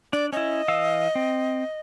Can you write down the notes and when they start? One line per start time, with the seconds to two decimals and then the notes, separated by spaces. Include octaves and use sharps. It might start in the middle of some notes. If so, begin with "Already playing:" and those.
0.13 D4 D5
0.33 C#4 E4 D#5
0.68 E3 F5 E6
1.15 C4